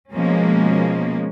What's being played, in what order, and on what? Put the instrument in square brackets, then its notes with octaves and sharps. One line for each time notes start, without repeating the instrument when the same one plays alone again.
[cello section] B2 F3 G#3 A#3 C#4